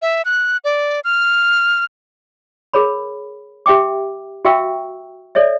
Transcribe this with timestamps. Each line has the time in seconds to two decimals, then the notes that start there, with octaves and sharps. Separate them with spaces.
0.02 E5
0.25 F#6
0.64 D5
1.04 F6
2.74 G#4 A#4 C#5 B5
3.66 G4 E5 G5 D6
4.45 F#4 E5 F5 G5 C#6 E6
5.35 A4 C#5 D5 E5